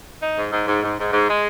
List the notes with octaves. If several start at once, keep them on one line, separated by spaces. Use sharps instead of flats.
D#4
G#2
G#2
G#2
G#2
G#2
G#2
G#3